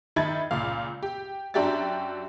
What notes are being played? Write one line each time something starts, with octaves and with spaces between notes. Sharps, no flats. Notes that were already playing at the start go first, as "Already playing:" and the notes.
D#3 D#4 E5 B5 G#6 A6
C#2 A#2 F5
G4
F#2 D4 F#4 G4 E5 A6